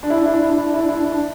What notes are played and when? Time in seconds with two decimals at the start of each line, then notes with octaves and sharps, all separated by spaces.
0.03 D4
0.10 E4
0.18 D4
0.26 E4
0.34 D4
0.42 E4
0.50 D4
0.58 E4
0.65 D4
0.73 E4
0.81 D4
0.89 E4
0.97 D4
1.05 E4
1.12 D4